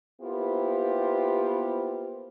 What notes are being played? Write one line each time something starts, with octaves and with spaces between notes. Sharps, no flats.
A#3 B3 E4 F4 G4 C5